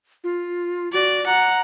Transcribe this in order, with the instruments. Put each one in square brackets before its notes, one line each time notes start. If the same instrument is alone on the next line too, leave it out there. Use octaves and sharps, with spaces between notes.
[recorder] F4
[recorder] F#4 [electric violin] D5
[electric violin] F#5 [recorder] A#5